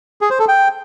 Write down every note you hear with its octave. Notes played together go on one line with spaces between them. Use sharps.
G#4
C5
A4
G5